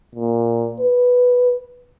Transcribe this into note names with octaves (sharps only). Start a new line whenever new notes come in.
A#2
B4